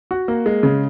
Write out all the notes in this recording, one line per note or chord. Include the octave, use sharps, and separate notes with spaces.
F#4
A#3
G#3
C#3